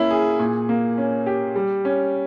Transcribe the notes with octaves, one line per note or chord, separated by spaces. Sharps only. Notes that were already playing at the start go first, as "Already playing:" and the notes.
Already playing: A#3 C#4 E4
G#4
A#2
A#3
C#4
G4
G3
C#4